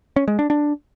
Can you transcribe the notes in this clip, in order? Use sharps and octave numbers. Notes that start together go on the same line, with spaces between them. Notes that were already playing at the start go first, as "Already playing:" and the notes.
C#4
G#3
D4
D4